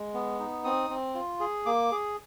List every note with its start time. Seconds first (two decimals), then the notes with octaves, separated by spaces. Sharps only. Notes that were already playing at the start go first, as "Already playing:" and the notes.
Already playing: G#3
0.14 B3
0.39 D#4
0.64 C4 D#6
0.90 C4
1.15 F4
1.40 G#4
1.66 A#3 D6
1.92 G#4